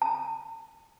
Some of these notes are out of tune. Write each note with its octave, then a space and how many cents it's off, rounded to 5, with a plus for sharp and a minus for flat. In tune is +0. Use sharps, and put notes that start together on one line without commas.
A5 +45